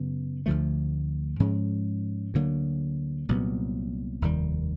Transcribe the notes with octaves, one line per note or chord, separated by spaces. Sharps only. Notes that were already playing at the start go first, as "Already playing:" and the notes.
Already playing: F#2 C#3 F#3 B3
D2 D3 F3 A3
G#2 F3 G#3 C#4
D2 D3 F#3 A#3
C2 A#2 F#3 B3
F1 D#2 D#3 G3